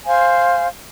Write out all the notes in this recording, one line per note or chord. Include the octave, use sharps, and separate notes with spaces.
C5 F5 G#5